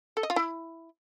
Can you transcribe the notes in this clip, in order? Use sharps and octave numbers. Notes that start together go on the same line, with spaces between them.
A4
D#5
F4
E4